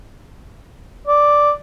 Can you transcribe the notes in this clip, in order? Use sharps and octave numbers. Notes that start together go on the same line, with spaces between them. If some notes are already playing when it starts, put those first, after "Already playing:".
D5